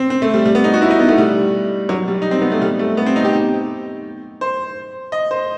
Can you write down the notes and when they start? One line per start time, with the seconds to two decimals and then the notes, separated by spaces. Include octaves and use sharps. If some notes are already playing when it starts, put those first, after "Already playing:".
Already playing: C4
0.10 C4
0.22 A3
0.34 G3
0.45 G3
0.55 B3
0.64 D#4
0.74 F#4
0.82 E4
0.90 D#4
1.00 B3
1.08 A3
1.18 G3
1.89 F#3
2.08 G3
2.22 D#4
2.31 C4
2.41 B3
2.52 A3
2.62 G3
2.79 A3
2.97 B3
3.06 C4
3.16 D#4
3.25 G4
4.41 C5
5.12 D#5
5.31 C5